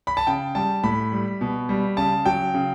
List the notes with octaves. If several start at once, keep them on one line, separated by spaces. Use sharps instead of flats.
B5
A5
C#3 G5
G3 A5
A2 B5
G3
B2
G3
C#3 A5
F#3 G5
C#3